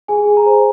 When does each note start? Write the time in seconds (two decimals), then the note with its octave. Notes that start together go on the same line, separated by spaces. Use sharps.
0.08 G#4 G#5
0.28 G#4
0.37 A#5
0.46 C5